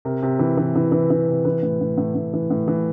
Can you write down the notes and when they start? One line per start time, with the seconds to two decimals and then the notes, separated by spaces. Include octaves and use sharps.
0.05 C3 A#4
0.23 C3
0.39 E3
0.57 E3
0.76 E3
0.92 E3
1.10 E3
1.28 C3
1.45 E3 B4
1.63 A2
1.81 A2
1.98 A2
2.15 A2
2.34 E3
2.50 A2
2.68 E3